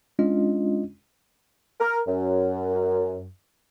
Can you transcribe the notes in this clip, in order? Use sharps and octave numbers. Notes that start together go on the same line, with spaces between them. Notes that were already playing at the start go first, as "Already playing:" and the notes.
G#3 C#4 D4 F4 D#5
A#4
F#2